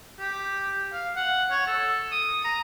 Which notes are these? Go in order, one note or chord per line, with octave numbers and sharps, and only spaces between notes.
G4
F5
F#5
C#5
A4
D#6
A#5